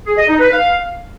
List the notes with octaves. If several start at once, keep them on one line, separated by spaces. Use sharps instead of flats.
G#4
D#5
D#4
B4
F5